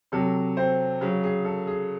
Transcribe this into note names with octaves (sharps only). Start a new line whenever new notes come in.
C3 F#3 A4
C4 C5
C#3 F#3
G#4
A4
G#4